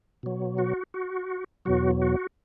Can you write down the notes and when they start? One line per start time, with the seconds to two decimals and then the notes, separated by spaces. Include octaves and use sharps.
0.23 B2 F#3
0.58 F#4
0.94 F#4
1.65 E2 B2 F#3 F#4
2.02 F#4